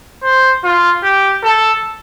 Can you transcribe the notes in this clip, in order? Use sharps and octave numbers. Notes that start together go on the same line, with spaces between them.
C5
F4
G4
A4